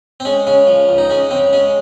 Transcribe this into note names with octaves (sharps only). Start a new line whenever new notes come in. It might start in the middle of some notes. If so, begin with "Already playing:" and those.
C4
G#3 C#4
C#3 C#4
F3
C#2
D#4
G#3 C#4
C#3 C4
G#3 C#4